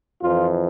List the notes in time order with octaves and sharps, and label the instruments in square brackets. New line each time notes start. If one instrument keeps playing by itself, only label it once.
[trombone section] F2 E3 F4